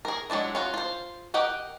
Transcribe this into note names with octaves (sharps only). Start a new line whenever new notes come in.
G#4 A#4
F#3 G#3 D4 E4
C#4 F4 F#4
F4 C5
G4 A#4 D#5 F#5 G5